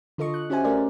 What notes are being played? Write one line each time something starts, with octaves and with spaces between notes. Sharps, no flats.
D3 F4 A4 D#5 C#6
F#6
C#4 F#4 G4 C5 E5 G#5
A3 C#4 A#4 D5